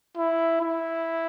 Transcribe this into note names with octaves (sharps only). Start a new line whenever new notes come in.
E4
E4